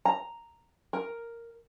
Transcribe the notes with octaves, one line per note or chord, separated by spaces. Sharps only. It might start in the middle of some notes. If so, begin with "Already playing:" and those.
A#5
A#4